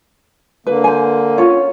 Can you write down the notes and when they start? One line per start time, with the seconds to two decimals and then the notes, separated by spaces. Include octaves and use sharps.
0.67 D3 A#3 B4
0.84 C5 G#5
1.37 C#4 F4 C#5